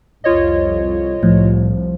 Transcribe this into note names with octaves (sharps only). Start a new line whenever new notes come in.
C2 F2 F4 C#5 D#5
C2 A2 F3